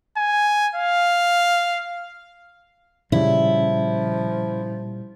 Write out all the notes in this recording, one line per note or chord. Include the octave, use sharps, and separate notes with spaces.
G#5
F5
A#2 C#3 F3 G3 E4